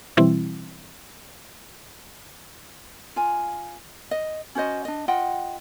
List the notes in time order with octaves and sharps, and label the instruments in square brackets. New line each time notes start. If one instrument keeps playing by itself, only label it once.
[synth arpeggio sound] B2 E3 G3 C4 E4
[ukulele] F4 G#5
D#5
C#4 F#4 C5 D#5
D4 D#5
F4 D#5 F#5 G5